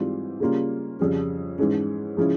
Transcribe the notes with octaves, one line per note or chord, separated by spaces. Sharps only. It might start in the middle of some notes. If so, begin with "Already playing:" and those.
Already playing: G#2 E3 G3 C4 F4
C#3 G3 A#3 C#4 F4
F2 C#3 G3 C#4
G#2 E3 G#3 C#4
C#3 F3 G#3 C#4 E4